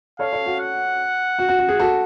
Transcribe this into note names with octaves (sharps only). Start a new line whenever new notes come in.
A4 C#5 F5
A4 C#5
F#4
F#5
F#4
F#4
F#4
G#4
F#4 A4